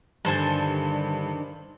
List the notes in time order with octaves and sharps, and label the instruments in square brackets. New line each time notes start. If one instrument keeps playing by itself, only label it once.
[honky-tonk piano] G2 [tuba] D3 [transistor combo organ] D#3 D4 [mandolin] A4 C5 G#5